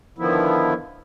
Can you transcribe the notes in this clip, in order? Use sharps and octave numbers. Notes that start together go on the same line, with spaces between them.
D3 D#3 F3 B3 E4